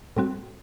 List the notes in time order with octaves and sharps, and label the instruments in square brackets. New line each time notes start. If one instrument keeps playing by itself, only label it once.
[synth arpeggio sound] A2 G3 C4 F#4